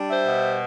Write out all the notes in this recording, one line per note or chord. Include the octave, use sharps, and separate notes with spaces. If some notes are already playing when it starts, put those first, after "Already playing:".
Already playing: G3 D4
C5 E5
B2